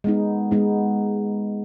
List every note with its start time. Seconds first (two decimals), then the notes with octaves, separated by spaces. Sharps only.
0.04 G#3 B3 D#4
0.51 G#3 B3 D#4